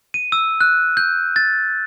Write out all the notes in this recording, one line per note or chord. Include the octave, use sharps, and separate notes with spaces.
D#7
E6
F#6
G6
A6